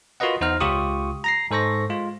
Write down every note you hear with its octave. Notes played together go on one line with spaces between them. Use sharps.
F4 F#4 A#4 B4 D#5 F#5
E2 D#4 C5 F#5 A#5 F6
C#2 F4 G4 C#6 D#6
A#5 A#6 C7
G#2 A4 C5 C#6 A#6
G#3 F4